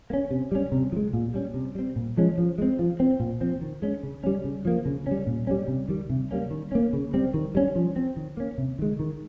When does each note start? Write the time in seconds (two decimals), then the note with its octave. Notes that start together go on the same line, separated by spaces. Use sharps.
0.10 A#3
0.13 C#4
0.31 C3
0.52 G3 C#4
0.72 C3
0.92 F3
0.96 G#3
1.13 A#2
1.34 G3 C#4
1.54 C3
1.75 G3 C4
1.96 A#2
2.17 F3 G#3 C#4
2.38 F3
2.58 G#3 C4
2.79 F3
3.00 C4
3.20 A#2
3.41 F3 C4
3.61 D#3
3.82 G#3 C#4
4.03 C#3
4.24 G3 C#4
4.45 C#3
4.65 F3 A#3
4.86 C#3
5.07 G3 C#4
5.27 A#2
5.47 G3 A#3 C#4
5.68 C3
5.88 D#3 G3
6.10 C3
6.31 G3 A#3 C#4
6.51 D#3
6.72 A#3 C#4
6.93 C#3
7.14 G3 C4
7.34 D#3
7.55 G3 C#4
7.76 F3
7.96 C4
8.17 D#3
8.37 A#3 C#4
8.58 C3
8.79 D#3 G#3
9.00 D#3